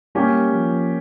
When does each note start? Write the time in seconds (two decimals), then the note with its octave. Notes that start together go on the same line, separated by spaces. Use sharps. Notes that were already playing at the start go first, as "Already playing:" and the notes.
0.15 G3 A#3 C#4 G4
0.53 F3